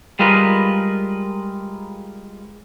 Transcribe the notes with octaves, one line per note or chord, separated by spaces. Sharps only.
G3 G#3 F4 A#4 B4